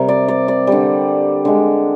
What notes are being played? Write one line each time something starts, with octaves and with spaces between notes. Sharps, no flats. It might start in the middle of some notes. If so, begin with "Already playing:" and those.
Already playing: C3 G3 A#4
D5
D5
D5
D3 G3
D3 G#3